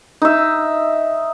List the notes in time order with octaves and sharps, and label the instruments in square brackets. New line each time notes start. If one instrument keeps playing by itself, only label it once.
[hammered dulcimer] D#4 E5